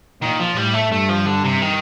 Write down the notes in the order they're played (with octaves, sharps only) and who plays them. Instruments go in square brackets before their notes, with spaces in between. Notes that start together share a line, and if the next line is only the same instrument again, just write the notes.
[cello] A#2 [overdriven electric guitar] D#3
[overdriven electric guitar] F3
[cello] A2 [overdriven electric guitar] G3
[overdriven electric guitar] A3
[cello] G2 [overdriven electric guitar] A3
[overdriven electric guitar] F3
D3
C3
D#3